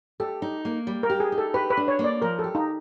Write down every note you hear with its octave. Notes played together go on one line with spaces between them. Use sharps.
G4 A4
D#4
A#3
G3
A#4
G4
G#4
D#4
A4
G4 B4
B4
D4
C#5
A#3
D5
F3 A#4
A4
G4
D#4